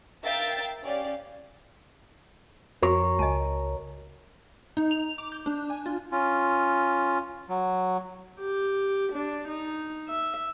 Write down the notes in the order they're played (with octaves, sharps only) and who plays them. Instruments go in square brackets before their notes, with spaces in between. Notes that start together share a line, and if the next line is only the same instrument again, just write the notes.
[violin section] A#4 E5 F5 G5 A6
C#4 G4 D5 F5
[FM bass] F2 [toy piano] F#4 [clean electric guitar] A#4 C#5
[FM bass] C#2 [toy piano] D#5 G#5 A5
[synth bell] D#4
F7
D6
G6
D4
G#5
F4
[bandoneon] C#4 F4
F#3
[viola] G4
D4
D#4
E5